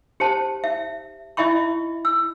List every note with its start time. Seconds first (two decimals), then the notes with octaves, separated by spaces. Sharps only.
0.20 G4 C5 A5
0.64 E5
1.37 E4 D#5 E5 B5 C#6
2.05 E6